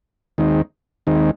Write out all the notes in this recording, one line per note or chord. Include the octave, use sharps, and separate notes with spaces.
D#2 D#3 G#3 C4 D#4
D#2 D#3 G#3 C4 D#4